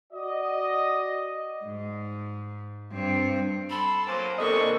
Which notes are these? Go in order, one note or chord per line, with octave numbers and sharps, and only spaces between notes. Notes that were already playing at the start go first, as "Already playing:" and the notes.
F#4 D5 D#5
G#2
G2 C4
A4 B5 C6 E6
F#3 A#3 C5 G#5 D6
C3 E3 A#3 D4 A4 D#5 C#6